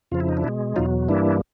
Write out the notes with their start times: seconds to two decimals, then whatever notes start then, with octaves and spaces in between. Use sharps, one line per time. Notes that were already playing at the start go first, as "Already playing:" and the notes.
0.11 F2 C#3 F3 F4
0.20 E4
0.29 D#4
0.37 D4 E4
0.44 B2 G#3
0.76 E2 B2 F#3 D#4 F4
1.08 G2 E3 G3 A#3 D4 E4